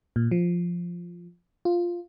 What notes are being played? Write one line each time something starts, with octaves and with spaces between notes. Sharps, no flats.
A#2
F3
F4